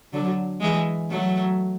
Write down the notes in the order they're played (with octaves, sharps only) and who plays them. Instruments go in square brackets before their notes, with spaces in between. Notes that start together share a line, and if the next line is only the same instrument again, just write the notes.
[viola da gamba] D3 F#3
E3 G#3
F#3 A3